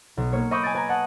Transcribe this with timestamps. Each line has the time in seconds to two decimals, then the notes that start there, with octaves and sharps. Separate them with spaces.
0.17 B1
0.32 A#3 C#5
0.51 D#5 E5 B5 C#6 D6 G6
0.63 G#5 C#6 E6 A6 D7
0.74 B4 G#5 A#5
0.89 D#5 F#5 A5